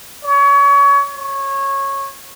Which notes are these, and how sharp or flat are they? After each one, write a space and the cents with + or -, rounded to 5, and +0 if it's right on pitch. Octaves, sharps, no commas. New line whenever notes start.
C#5 +30
C#5 -15